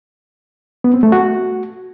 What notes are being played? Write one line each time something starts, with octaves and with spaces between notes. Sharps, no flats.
B3
C4
A3
F#4